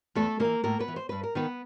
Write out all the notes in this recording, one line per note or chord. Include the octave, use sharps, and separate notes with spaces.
E2 A3 A4
C#3 E3 A#3 A#4
A2 A#3 A#4
B3 B4
E3
C5
G2 B4
A#4
D#3 B3 B4